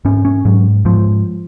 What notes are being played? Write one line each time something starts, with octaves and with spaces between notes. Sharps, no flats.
G#2 C#4
C#4
G#2 F#3
G#2 F3